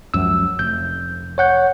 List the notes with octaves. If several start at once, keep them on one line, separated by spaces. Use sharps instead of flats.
C#2 F#2 F3 E6
F1 G6
C#5 F#5 G6